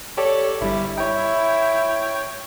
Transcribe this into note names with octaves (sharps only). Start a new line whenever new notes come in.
G4 A4 C#5 D5
G1 G3 E4
E4 C#5 G5